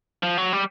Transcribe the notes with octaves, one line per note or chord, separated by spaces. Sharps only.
F3
F#3
G3